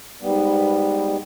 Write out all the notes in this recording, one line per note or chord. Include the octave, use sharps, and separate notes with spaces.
G#2 G3 B3